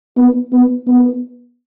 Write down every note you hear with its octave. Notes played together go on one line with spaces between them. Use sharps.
B3
B3
B3